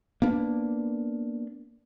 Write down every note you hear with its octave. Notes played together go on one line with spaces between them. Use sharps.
A#3 B3 D4